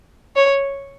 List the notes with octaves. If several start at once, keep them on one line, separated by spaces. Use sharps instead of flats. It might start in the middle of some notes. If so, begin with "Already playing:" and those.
C#5